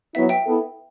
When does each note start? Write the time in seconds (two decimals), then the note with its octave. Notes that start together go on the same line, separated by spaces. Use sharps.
0.14 F#3 B3 E4 E5
0.29 E5 G5
0.45 B3 E4 A4